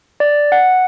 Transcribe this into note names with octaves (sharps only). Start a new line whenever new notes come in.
D5
F#5